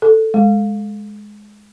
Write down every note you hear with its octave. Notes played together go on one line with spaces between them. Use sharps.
A4
G#3